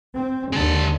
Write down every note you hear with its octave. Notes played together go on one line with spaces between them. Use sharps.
C4
D#2 D3 G#3 A5